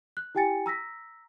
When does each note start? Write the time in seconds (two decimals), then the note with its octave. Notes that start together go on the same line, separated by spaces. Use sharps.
0.17 F#6
0.35 E4 G4 G5 G#5 A6 C#7
0.66 A#5 E6 A#6 B6